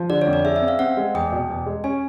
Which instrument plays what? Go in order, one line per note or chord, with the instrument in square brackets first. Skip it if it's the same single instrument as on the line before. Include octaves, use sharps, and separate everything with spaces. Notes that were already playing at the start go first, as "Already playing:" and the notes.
Already playing: [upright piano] F3
[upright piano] D3 [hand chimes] D5
[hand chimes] C#5
[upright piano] F2
[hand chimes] D5
[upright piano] G#4 [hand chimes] E5
[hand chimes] E5
[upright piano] C4
[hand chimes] F5
[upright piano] C4 [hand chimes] F#5
[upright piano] G#3
[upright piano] E2 [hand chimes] G5
[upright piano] B2
E2
G#3
[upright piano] C#4 [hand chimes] G#5